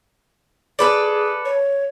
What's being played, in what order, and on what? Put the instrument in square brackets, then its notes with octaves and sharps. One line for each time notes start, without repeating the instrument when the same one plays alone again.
[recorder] G#4 [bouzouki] A4 B4 D5
[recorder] C#5